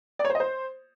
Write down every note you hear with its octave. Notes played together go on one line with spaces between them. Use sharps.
D5
C#5
C5
D#5
C5